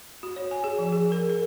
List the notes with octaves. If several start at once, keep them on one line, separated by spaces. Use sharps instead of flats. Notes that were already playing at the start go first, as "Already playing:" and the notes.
F#4
C#5
G#5
G#4
F3
G#4
A#4
A#4